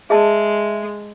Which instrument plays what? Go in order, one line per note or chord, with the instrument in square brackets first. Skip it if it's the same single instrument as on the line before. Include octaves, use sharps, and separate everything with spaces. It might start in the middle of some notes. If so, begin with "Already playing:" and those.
[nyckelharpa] G#3 [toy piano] G#4 D#5 A5 [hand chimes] E5